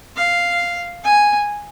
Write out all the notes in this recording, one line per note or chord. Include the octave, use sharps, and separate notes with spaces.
F5
G#5